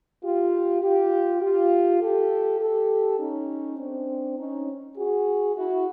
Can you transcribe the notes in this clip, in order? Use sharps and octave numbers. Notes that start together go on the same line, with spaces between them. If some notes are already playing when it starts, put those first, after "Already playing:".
F4 G4
F4 G4
F4 G4
G4 A4
G4 A4
C#4 D#4
C4 D4
C#4 D#4
F#4 G#4
E4 F#4